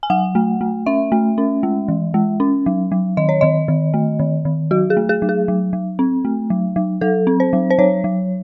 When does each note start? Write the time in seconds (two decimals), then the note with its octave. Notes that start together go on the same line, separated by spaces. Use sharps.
0.03 G#5
0.10 F#3 F#5
0.35 A3
0.61 A3
0.86 C#4 E5
1.12 A3
1.38 C#4
1.63 G#3
1.88 E3
2.14 G#3
2.40 C#4
2.66 F#3
2.92 F#3
3.17 D#3 D#5
3.29 C#5
3.41 D#3 D#5
3.68 D#3
3.94 A3
4.19 D#3
4.45 D#3
4.71 F#3 F#4
4.90 G#4
4.97 A3
5.09 G#4
5.22 F#3
5.29 G#4
5.48 F#3
5.73 F#3
5.99 C4
6.25 A3
6.50 F#3
6.76 F#3
7.01 F#3 A4
7.27 C4
7.40 C5
7.53 F#3
7.70 C5
7.78 F#3 C#5
8.04 F#3